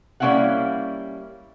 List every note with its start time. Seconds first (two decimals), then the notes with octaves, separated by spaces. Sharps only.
0.20 G3 A#3 C#4 E4 F5 F#5